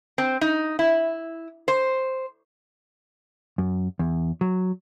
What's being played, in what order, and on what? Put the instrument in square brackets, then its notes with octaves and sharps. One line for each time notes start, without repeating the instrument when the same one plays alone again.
[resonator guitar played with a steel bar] C4
D#4
E4
C5
[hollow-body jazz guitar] F#2
E2
F#3